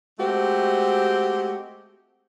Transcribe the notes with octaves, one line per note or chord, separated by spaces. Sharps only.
G#3 A3 C4 F#4 G4